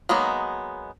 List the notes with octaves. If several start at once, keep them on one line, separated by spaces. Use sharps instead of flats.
F#3 G#3 A#3 B3 D#4